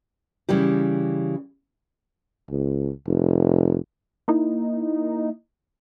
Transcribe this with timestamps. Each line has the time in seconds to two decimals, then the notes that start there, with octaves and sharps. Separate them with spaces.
0.49 C#3 E3 G3 G4
2.50 C#2
3.07 F1
4.28 A#3 D#4 E4